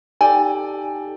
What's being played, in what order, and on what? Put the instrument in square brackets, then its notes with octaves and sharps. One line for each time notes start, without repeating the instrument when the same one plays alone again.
[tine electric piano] D#4 G4 A4 [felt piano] D5 G5 [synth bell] G#5